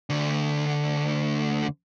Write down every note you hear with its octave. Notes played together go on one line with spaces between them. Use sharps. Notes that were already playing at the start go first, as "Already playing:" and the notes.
D2 D3